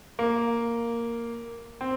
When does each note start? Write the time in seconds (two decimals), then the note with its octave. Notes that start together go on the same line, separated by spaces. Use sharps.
0.19 A#3
1.81 C4